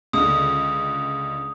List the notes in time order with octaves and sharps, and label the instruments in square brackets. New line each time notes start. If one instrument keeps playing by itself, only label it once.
[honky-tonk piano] C#2 D3 [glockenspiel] D#6